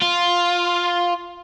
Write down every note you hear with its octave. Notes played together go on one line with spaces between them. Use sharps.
F4